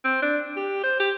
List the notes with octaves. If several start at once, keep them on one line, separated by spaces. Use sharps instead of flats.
C4
D4
G4
C5
G4